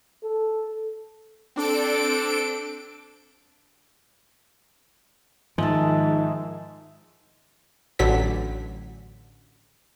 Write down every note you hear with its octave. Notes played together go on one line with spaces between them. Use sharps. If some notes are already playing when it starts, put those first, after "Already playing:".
A4
C4 D4 A4 D7
G#2 D#3 F3 G#3 E5 A5
A1 D3 F#3 B6